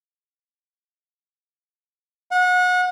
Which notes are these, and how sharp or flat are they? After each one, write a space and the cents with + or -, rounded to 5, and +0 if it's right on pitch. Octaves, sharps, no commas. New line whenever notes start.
F#5 -30